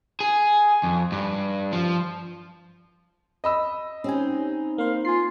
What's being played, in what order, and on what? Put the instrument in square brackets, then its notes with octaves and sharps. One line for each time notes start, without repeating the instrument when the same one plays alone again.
[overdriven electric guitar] G#4
F2
G2
F3
[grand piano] D#5 B5 E6
[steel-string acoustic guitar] C4 D#4 [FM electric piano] C#4 G4 G#5
[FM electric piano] A#3 C5 [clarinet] F5
[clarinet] F4 [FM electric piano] G#5 C7